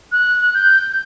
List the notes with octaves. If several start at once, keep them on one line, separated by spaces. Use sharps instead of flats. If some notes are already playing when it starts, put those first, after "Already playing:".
F#6
G6